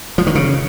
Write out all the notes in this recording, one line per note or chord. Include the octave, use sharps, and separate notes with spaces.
F3
D#3
C#3